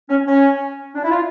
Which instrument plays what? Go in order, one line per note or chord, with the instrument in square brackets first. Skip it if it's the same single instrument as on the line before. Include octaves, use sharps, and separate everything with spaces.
[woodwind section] C#4
C#4
D4
E4
F4